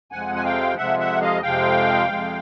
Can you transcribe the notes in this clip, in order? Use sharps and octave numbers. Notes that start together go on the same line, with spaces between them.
F2 C3 F3 G#3 F#5 G#5
G#5
F5 G5
F2 C3 F3 G#3 E5 F#5
E5 F#5
D#5 F5
F2 C3 F3 G#3 F5 G5
F2 C3 F3 G#3